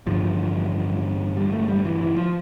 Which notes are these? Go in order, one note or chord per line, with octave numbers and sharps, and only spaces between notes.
A1 G2 D3 F3
G3
A3
G3
E3
E3
F3